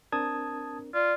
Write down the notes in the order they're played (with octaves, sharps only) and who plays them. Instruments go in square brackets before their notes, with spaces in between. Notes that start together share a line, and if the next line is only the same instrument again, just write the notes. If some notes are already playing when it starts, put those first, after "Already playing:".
[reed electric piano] C4 D4 A#4 [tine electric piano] A5 D#6 G#6
[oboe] F4 [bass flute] D5